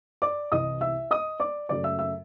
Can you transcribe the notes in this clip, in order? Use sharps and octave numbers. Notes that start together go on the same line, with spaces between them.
D5 D6
C2 C3 E3 D#5 D#6
E5 E6
D#5 D#6
D5 D6
F#2 C#3 F#3 A3 C#4 D5 D6
E5 E6
E5 E6